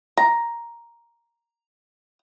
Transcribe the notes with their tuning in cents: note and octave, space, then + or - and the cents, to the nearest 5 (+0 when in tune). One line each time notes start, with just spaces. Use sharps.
A#5 +5